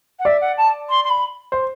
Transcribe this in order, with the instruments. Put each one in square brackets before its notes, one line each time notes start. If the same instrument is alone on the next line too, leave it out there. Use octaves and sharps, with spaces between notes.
[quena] F#5
[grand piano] D5 [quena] E5
[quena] F#5
A5
C6
C6
B5
[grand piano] C5